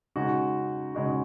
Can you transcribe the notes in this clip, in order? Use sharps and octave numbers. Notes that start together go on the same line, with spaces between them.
C#3 G#3 D#4 F#4
C#3 G#3 D#4 F#4